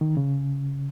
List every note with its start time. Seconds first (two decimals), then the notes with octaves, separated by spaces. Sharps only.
0.01 D#3
0.17 C#3